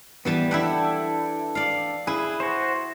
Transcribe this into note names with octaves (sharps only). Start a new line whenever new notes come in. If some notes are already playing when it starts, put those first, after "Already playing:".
E3 G3 B3 A5
D4 E4 A4 E5 F#5 G5
D5 F5
E4 G#4 B4
F#4 C5